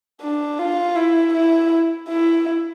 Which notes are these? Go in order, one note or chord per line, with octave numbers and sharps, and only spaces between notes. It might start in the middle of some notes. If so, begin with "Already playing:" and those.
D4
F4
E4
E4
E4